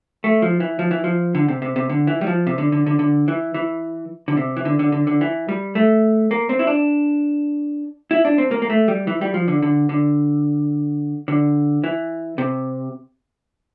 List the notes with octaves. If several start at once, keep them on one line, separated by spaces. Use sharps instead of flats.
A3
F3
E3
F3
E3
F3
D3
C3
C3
C3
D3
E3
G3
F3
C3
D3
D3
D3
D3
E3
E3
D3
C3
E3
D3
D3
D3
D3
E3
G3
A3
A#3
C4
E4
D4
E4
D4
C4
A#3
A#3
A3
G3
E3
G3
F3
D3
D3
D3
D3
E3
C3